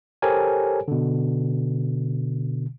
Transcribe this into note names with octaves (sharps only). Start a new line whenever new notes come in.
G4 A4 A#4 C5 C#5 G#5
B2 D3